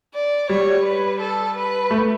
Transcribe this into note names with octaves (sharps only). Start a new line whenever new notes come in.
D5
G3 C#5
B4
A4
B4
A3